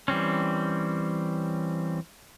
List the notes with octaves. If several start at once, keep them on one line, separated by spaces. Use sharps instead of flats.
E3 G3 C4 C#4